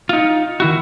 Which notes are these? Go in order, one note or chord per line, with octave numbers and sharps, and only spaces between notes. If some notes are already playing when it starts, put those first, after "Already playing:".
D#4 F4
D#3 E4 F#4